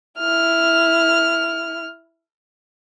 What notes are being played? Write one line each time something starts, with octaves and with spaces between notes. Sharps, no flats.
E4 F6